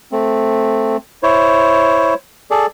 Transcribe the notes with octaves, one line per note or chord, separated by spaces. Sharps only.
A3 C4
E4 C5 C#5
G#4 A4 D5